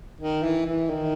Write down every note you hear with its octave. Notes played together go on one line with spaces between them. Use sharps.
D#3
E3
E3
D#3